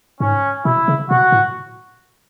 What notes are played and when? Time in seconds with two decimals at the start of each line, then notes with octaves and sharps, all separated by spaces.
0.20 G#2 C#4
0.65 B2 E4
0.88 C#3
1.10 B2 F#4
1.32 A2